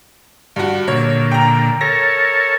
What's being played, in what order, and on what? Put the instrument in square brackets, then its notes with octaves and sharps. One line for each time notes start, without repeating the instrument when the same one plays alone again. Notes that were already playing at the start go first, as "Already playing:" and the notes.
[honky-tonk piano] G2 F#4
[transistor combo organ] A#2 D3 [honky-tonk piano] C#5
[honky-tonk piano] G5 A#5
[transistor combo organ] A4 A#4 C#5 [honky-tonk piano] A#6